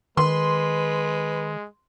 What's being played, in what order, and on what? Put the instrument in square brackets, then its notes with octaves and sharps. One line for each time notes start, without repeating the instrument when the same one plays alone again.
[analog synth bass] D#3 [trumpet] G#3 [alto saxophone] B4 [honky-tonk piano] C6